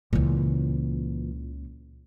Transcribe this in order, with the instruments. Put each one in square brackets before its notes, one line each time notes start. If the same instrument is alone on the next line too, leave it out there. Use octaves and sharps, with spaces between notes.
[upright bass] C#2 C#3 [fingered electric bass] A#2 E3